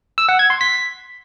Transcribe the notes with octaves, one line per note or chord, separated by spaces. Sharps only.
E6
F#5
G#6
C6
B6